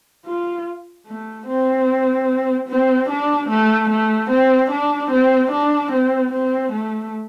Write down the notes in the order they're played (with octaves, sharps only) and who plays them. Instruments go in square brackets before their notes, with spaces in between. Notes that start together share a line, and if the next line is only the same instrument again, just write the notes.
[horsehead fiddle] F4
A3
C4
C4
D4
A3
A3
C4
D4
C4
D4
C4
C4
A3